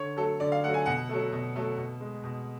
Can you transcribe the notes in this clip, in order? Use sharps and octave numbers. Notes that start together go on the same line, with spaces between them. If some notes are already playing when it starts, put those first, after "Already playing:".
Already playing: D3 C#5
F#3 A3 A4
D3 D5
F5
F#3 A3 F#5
G#5
B2 F#5
F#3 A3
B2
F#3 A3
B2
G#3
B2